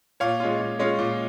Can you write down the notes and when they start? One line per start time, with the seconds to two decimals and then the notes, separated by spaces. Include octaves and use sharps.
0.20 A#2 C#5 F5
0.40 G#3 C#4 F4
0.60 A#2
0.79 G#3 C#4 F4
0.99 A#2